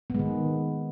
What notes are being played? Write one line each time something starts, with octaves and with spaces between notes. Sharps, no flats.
D#3 G#3 B3